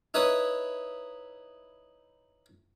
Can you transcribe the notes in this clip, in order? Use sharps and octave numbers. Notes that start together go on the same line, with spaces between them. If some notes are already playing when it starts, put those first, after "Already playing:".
D#4 E4 B4 C#5 D#5 D#6